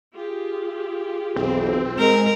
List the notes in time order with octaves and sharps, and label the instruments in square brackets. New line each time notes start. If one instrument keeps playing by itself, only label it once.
[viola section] F4 G4 G#4
[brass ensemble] B1 F2 E3 [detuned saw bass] C4
[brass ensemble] G#3 [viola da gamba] A#4